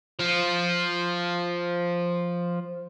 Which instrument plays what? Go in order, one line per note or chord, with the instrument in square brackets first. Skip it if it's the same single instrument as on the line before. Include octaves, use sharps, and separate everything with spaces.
[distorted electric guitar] F3 F4